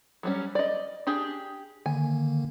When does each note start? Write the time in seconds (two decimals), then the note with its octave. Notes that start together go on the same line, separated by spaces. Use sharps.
0.23 F#3 G3 C#4
0.55 D5 D#5
1.07 D4 G4 G#4
1.86 D3 D#3 A#3 G#5